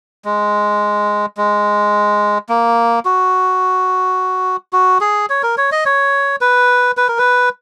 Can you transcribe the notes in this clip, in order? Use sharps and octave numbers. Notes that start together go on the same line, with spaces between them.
G#3
G#3
A#3
F#4
F#4
G#4
C#5
A#4
C#5
D#5
C#5
B4
B4
A#4
B4